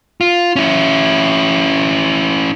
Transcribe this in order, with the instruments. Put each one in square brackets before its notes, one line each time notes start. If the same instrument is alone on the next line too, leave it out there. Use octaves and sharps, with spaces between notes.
[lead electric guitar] F4
C#4 E4